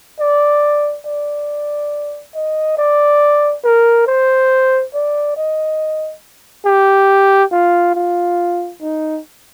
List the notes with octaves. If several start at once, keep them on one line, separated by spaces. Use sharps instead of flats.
D5
D5
D#5
D5
A#4
C5
D5
D#5
G4
F4
F4
D#4